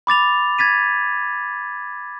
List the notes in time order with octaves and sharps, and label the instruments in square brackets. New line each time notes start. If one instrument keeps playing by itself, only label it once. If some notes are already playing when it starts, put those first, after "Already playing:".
[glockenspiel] B5 D6 A6 F7
G#6 A6 B6 D#7